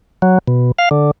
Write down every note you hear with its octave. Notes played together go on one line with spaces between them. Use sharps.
F#3
B2
F5
D3